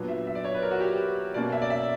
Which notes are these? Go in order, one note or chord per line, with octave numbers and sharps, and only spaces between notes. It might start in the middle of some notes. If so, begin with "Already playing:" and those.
Already playing: A#2 F#3 B3 D4
E5
E5
D5
C#5
B4
A#4
F#4
G4
B2 A#3 C#4 D5
E5
D5
E5